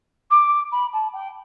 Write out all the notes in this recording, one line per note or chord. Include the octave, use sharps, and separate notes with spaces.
D6
B5
A5
G5